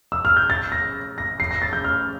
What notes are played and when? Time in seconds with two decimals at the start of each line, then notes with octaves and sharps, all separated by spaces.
0.12 E6
0.25 F6
0.37 G6
0.50 A6
0.72 A#6
1.18 A#6
1.40 C7
1.51 A#6
1.62 A6
1.73 G6
1.84 F6